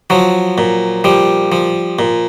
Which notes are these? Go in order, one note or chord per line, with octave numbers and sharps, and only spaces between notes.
F3 F#3
A#2
F3 G3
F3
A#2